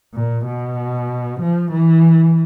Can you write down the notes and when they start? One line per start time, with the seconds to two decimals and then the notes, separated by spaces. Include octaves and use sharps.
0.15 A#2
0.46 B2
1.41 F3
1.72 E3